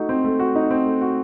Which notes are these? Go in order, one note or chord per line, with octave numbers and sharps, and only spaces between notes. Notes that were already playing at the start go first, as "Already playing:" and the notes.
Already playing: A3 D#4 F#4
C4
A3
F#4
D#4
C4
A3
F#4